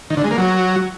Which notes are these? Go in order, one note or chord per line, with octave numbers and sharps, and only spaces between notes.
D#3
D3
G#3
A#3
F#3